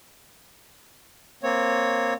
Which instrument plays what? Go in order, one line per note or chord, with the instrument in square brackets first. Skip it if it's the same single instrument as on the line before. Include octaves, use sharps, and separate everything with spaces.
[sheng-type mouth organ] A#3 C4 C#5